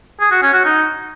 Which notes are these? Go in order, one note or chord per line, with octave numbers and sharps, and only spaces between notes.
G#4
F#4
C#4
F#4
D#4